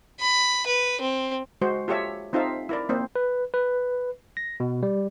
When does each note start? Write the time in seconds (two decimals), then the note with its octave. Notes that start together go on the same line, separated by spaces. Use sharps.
0.20 B5
0.66 B4
1.01 C4
1.62 G#3 F#4 C5
1.88 F4 G4 A4 C#5 E5
2.33 C4 D#4 F4 A4 E5 F5
2.69 E4 A#4 D5
2.89 A#3 C4 C5
3.16 B4
3.54 B4
4.37 A#6
4.60 B2
4.83 G3